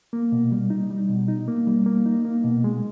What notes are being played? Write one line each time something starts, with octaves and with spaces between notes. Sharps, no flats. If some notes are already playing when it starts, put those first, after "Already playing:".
A#3
B2
G3
D#4
G3
B2
D#4
A#3
G3
A#3
D#4
A#3
B2
G#3